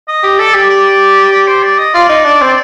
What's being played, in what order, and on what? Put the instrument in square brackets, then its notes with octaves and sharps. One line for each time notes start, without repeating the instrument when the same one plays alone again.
[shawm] D#5
[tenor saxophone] G4
[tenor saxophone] A4 [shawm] D5
[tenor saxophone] G4
[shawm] D5
D5
C5
D5
D#5
[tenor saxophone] F4 [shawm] D5
[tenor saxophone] D#4
D4
C4